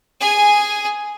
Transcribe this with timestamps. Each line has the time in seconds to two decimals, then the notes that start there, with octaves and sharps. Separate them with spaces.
0.21 G#4 G#5